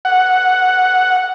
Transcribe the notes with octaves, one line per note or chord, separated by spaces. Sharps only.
F#5